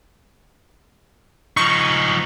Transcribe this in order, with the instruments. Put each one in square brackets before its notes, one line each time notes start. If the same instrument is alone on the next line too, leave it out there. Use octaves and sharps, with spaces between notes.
[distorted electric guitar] F3 D#4 [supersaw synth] C#6